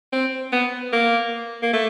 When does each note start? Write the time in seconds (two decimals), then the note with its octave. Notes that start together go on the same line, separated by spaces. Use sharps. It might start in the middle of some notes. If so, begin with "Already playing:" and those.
0.13 C4
0.52 B3
0.93 A#3
1.63 A#3
1.73 A3